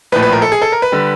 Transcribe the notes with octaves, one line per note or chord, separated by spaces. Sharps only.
A#1 A2 F3 B4
B4
A#4
A4
G#4
A4
A#4
B4
D3 G3